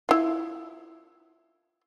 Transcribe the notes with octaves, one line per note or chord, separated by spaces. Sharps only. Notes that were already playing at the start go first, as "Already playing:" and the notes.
E4 F4